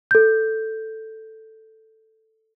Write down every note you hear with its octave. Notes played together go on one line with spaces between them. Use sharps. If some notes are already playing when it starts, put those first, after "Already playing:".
A4 G6